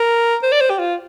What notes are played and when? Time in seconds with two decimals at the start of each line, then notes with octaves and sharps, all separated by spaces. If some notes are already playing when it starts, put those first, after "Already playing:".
Already playing: A#4
0.43 C5
0.52 D5
0.61 C5
0.70 G4
0.79 F4